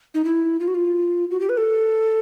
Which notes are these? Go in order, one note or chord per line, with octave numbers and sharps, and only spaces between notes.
D#4
E4
F4
F#4
F4
F#4
G4
B4
A4